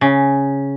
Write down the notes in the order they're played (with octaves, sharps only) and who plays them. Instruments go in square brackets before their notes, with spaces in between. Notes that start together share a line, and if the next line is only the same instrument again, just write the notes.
[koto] C#3